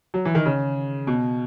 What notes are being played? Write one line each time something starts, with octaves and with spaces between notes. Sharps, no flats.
F#3
E3
D#3
C#3
B2